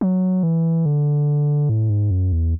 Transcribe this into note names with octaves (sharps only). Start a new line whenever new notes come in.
F#3
E3
D3
A2
G#2
F#2
E2